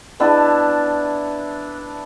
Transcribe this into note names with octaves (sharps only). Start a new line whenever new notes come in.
B3 D4 E4 A5